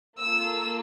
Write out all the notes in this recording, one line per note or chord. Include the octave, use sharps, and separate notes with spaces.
A#3 F4 A4 E6